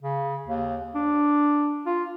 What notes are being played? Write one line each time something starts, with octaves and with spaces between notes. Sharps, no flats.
C#3
D#2
D4
F4